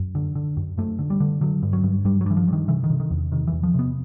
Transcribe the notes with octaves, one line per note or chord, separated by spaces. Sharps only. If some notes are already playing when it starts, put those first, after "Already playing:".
Already playing: F#2
D3
D3
F#2
F#2 A3
D3
G3
D3
D3 F#3
G2
F#3
G2
G2 G3
F#3
G2 E3
F3
G2 D#3
C3 E3
D#3
C3
D#3
E2
C3 D#3
E3
E2
F3
C3 B3